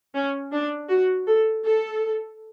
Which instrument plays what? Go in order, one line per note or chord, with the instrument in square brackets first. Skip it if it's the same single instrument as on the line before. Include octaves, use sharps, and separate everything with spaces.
[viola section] C#4
D4
F#4
A4
A4